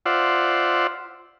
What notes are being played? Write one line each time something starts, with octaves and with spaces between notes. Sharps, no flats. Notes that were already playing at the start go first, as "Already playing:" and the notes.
F4 C5 D5 E5 F#5